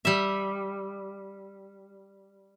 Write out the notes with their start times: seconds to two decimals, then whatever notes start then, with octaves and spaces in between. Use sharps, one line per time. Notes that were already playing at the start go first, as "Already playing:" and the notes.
0.05 G3 E5